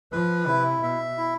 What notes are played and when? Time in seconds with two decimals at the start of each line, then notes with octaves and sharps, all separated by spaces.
0.12 F3 B4
0.47 C3 E4
0.82 B2 E5
1.18 E4